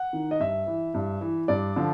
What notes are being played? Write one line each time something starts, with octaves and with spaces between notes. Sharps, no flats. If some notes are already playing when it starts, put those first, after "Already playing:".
Already playing: F#5
D#3
D#5
G2 E5
E3
G2
E3
G2 D5
D3 F3